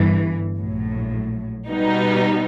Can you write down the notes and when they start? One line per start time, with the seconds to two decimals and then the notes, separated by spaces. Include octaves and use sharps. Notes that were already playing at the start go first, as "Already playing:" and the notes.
Already playing: G1 G2 E3
0.56 A#1 A2 F#3
1.68 B2 G3 B3 D#4